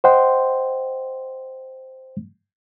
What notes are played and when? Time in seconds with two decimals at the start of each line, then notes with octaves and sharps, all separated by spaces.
0.04 C5 D#5 F#5 G5 C6